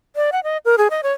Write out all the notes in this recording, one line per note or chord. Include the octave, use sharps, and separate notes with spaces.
D5
F#5
D#5
A#4
G#4
D#5
C#5